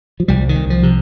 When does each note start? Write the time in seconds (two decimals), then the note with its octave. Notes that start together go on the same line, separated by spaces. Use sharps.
0.20 F3
0.28 C2 G3
0.49 D#3
0.56 C2
0.70 F3
0.83 C3